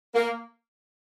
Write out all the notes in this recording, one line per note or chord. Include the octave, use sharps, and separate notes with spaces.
A#3